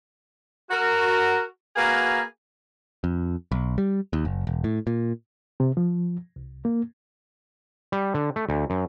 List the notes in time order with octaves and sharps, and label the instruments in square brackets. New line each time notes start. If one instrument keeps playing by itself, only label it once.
[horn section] F#4 A#4
A#3 F#4 G#4 B4 F5 A#5
[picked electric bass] F2
B1
G3
D#2
F#1
E1
A2
A#2
[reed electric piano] C3
F3
C2
A#3
[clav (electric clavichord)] G3
D3
A3
D2
F#2